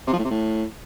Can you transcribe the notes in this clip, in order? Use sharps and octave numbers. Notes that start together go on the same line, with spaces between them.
C3
F3
A2
C3
A2